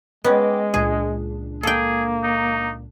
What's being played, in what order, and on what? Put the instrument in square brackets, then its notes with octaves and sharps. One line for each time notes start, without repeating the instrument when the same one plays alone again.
[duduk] G#3 [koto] B3 C#4 [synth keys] D#5 G5 D6
[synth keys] C#2 A#2 D4 [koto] G#4
[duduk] A#3 [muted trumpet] G#4 [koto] A4 G5
[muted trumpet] D#4